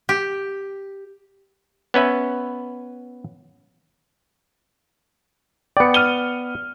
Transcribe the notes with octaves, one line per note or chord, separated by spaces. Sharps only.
G4
B3 C#4 B4 E5
B3 D5 G5 C#7
F6 D#7 G7